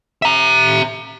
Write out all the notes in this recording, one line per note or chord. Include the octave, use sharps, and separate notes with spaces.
E5 A#5